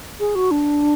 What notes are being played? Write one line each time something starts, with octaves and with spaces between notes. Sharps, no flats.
G#4
F#4
D4